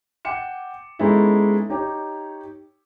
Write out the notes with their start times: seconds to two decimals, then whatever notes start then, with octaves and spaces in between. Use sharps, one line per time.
0.25 F#5 G5 D6 C#7 E7
0.99 G#3 B3 C#4 D#4 E4 A4
1.70 D#4 G4 C#5